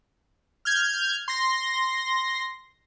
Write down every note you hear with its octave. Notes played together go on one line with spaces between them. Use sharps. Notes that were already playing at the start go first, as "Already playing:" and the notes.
F6 G6 G#6
C6 A#6